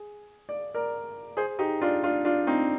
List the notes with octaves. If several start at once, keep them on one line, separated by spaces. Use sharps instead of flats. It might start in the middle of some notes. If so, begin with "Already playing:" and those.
Already playing: G#4
D5
A#4 D5
G#4 C5
D#4 G4
D4 F4
D4 F4
D4 F4
C4 D#4